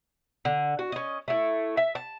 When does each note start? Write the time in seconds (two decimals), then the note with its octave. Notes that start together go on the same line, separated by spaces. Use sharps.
0.45 D3
0.79 F#4
0.92 C#4 D#5
1.28 A3 E4
1.77 E5
1.95 A5